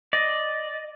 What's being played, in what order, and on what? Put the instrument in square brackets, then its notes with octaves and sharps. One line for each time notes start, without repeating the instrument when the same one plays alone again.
[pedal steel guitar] D5 [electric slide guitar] D#5